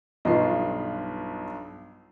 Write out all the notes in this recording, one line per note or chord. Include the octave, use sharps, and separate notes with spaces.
B1 G2 F4 B4 D#5 C7